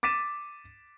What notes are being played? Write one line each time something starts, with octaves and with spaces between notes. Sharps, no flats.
D6 A6 B6 D#7 E7